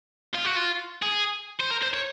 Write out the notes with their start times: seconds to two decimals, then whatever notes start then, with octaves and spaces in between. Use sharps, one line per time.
0.35 F4
0.46 F#4
0.56 F4
1.02 G#4
1.60 C5
1.71 A#4
1.83 C5
1.94 C#5